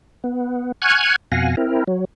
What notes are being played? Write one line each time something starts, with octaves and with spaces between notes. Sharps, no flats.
B3
F#5 G#5 C#6 F6 F#6 G#6
F2 B2 F5 F#5 G#5 A#6
C4 E4 A#4
F#3